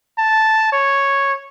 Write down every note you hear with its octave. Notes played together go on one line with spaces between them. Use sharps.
A5
C#5